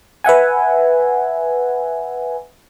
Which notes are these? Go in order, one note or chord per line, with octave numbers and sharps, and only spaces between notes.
B4 E5 F#5 G#5